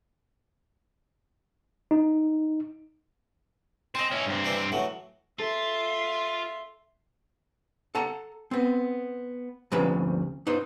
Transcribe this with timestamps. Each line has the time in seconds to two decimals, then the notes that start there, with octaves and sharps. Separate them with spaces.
1.91 D#4
3.95 C4 D#5 G#5
4.11 C#4 E4
4.26 G2 C4
4.45 E3 D4 E4
4.72 A2 E3 F#3
5.39 F4 A4 E5 C6
7.95 A4 F#5 A5 A#5
8.51 B3 C4
9.72 D2 C3 F3 C#4 B4 B5
10.47 D#4 B4 C5